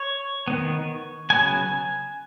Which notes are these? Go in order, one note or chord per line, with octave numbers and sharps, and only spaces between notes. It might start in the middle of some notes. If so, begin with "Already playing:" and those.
Already playing: C#5
D#3 B3
C#3 F#3 B3 G#5